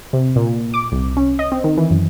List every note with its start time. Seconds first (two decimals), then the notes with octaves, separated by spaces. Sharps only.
0.13 C3
0.36 A#2
0.74 D6
0.92 C2
1.17 C#4
1.39 D#5
1.52 C4
1.64 D#3
1.78 E3
1.91 F#2